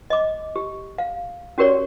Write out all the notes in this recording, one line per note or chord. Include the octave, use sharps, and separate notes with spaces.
D#5 D6
G4
F5
C#4 F#4 G4 A#4 C#5 D5